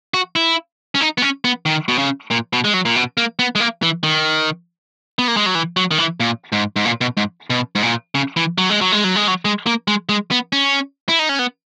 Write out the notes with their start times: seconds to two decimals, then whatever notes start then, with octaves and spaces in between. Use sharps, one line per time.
0.14 F#4
0.36 E4
0.95 C#4
1.01 D#4
1.18 B3
1.22 C#4
1.44 B3
1.66 D#3
1.88 B2
1.98 C#3
2.31 A#2
2.53 B2
2.64 G#3
2.74 F#3
2.85 A#2
2.96 B2
3.17 A#3
3.39 B3
3.55 G#3
3.60 A#3
3.83 E3
4.03 D#3
5.19 B3
5.28 A#3
5.37 G#3
5.46 F#3
5.55 E3
5.77 F#3
5.91 D#3
5.98 E3
6.20 A#2
6.52 G#2
6.76 G#2
6.85 A#2
7.01 B2
7.17 G#2
7.50 B2
7.75 G#2
7.83 A#2
8.15 C#3
8.37 E3
8.58 F#3
8.70 G#3
8.81 F#3
8.92 G#3
9.04 F#3
9.16 G#3
9.28 F#3
9.45 G#3
9.66 A#3
9.88 G#3
10.09 G#3
10.31 B3
10.53 C#4
11.09 E4
11.19 D#4
11.29 C#4
11.39 B3